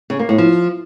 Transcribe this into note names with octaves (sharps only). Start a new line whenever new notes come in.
C#3
A#3
A2
F3